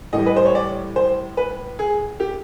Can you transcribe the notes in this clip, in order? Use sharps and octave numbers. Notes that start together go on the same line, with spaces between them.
A2 E3 G3 D#5
B4
C5
C#5
D5
C5
B4
G#4
G4